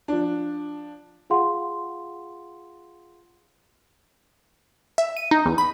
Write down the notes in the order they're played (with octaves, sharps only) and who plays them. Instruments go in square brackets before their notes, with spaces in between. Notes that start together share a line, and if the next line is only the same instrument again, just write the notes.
[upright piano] F3 D4
[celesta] F4 G#4 F5 F#5 C6
[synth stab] E5
D#7
D#4
E2
B5